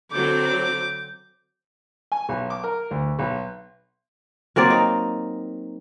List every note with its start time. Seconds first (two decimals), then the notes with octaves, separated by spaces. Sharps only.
0.12 D3 F#3 C4 D6 G6
2.12 G#5
2.29 B1
2.50 D6
2.64 A#4
2.91 D2
3.19 B1
4.56 F#3 A#3 C4 D5
4.70 D#4